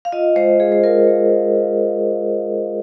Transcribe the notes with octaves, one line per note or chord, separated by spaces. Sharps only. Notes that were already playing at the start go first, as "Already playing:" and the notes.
F5
F4 D#5
G#3 C5
G#3 G#4
C5
F4 A#4
G#3
F4
F4